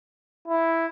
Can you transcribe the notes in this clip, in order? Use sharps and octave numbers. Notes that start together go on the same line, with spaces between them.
E4